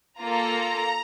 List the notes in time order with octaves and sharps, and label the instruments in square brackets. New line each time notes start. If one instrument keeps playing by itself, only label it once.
[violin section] A#3 F4 A4 A#5